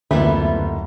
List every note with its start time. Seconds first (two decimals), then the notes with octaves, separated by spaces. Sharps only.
0.11 F#1 D2 E3 G3 A3 B3 E4 F4